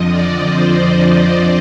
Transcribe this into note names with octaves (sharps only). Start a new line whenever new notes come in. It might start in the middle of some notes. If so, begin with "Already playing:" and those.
Already playing: F2 D3 F3 D#5
D5
C5